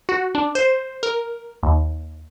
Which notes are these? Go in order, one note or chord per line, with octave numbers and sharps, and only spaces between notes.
F#4
D4
C5
A#4
D#2